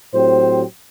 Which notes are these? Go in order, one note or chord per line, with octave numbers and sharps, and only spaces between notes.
A2 F#3 C4 G4 C5